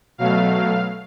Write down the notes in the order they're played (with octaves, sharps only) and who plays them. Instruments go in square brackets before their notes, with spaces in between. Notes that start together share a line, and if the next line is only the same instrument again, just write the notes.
[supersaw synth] B2 F#3 A3 F5